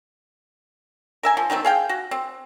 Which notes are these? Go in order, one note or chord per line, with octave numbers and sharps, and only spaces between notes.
A#4 E5 G#5
F3
D#3 F#3 A3 C4
G#4 F5 G5
F#4
C4